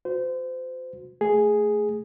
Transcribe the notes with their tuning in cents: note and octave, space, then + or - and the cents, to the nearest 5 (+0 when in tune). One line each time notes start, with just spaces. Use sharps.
F#4 -25 C5 -30
A3 +0 G#4 +0